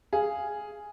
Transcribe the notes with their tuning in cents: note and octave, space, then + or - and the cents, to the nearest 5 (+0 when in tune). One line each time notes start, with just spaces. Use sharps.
G#4 +0 F5 -10